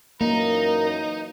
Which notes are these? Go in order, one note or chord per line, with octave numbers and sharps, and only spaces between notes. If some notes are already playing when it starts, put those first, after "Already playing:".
F#2 E3 A#3 D#4 A#4 A#5